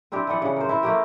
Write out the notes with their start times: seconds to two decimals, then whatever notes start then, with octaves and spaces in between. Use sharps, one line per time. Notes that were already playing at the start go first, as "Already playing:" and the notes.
0.12 C4 D4 E4 G4
0.27 E3 B3 D4 F#5
0.42 C#3 F#5
0.56 A#4 C5
0.69 E4 C5
0.83 A3 A#3 G4